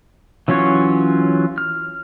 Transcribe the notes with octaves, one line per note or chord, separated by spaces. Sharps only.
E3 F#3 C#4 F4 C#5
F6